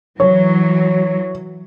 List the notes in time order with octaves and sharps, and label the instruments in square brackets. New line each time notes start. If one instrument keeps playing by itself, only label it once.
[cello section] E3 F#3 [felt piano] C#5